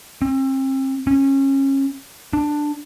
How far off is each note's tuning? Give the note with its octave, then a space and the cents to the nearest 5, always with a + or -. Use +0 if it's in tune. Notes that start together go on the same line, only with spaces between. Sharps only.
C4 +35
C#4 -25
D4 +10